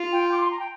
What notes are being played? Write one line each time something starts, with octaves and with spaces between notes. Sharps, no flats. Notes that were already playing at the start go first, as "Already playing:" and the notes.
Already playing: F4
G5
D6
C6
A#5
G5